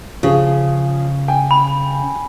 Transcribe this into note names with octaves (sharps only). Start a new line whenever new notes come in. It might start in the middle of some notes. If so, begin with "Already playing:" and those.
C#3 F3 C#4 G#4
G5 G#5
B5